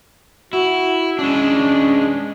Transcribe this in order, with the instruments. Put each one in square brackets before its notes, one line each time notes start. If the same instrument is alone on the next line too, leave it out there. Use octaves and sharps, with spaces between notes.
[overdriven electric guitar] E4 [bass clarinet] F#4
[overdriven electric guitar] G#3 D4 [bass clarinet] C#4